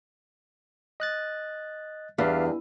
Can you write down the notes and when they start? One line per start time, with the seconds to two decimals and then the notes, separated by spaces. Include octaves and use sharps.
1.00 D#5 F#6 A6
2.18 E2 G2 D5 E5 F5